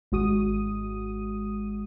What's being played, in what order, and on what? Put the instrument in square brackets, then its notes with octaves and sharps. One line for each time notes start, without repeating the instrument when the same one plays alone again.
[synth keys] G#1 G#3 F#4 D#6 D#7